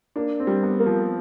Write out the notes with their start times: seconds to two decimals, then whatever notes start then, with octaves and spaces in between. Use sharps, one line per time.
0.16 A#3 D4
0.40 C4
0.47 G3
0.63 B3
0.79 A#3
0.86 F3